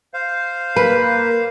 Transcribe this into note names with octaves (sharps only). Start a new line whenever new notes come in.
C5 F5
A#3 B4